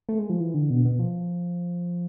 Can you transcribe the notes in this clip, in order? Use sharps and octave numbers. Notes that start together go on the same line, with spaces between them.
A3
G#3
F3
E3
D3
B2
B2
F3